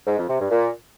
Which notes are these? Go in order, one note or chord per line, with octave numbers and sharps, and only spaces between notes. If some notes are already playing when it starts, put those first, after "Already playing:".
G#2
F2
C3
G2
A#2